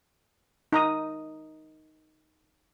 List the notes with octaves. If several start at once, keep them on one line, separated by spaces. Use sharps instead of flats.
D#4 A#5 D#6